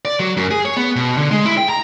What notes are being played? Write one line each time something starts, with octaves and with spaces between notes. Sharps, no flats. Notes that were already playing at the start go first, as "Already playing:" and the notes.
D5
F#3
F#2
G#4
C#5
B3
B2
D3
G#3
E4
G5
A#5